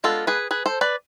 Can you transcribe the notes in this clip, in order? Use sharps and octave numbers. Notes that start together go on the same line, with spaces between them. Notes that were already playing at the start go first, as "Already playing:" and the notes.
G#3 B3 D4 F4 A4
G#4 B4
G#4 B4
A4 C5
B4 D5